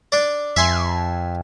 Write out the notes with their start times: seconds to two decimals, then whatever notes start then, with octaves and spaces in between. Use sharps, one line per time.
0.12 D4 D5
0.56 F2 E5 G#5 C6